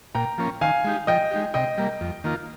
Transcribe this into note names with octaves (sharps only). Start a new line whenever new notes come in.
A#2 G5 A#5
F3 A#3 C#4
D#3 F5 G#5
G#3 D#4 G4
F3 D#5 G5
G#3 D#4 G4
C3 D#5 G5
G3 A#3
F2
D#3 A#3 F4